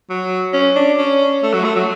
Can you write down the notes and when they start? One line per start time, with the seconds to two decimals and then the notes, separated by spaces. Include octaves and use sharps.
0.10 F#3
0.53 C#4
0.76 D4
0.99 C#4
1.43 A3
1.53 F#3
1.64 A3
1.76 F#3